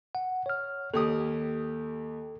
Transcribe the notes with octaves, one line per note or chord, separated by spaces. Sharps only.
F#5
C#5 F6
D#2 G4 A4 D#6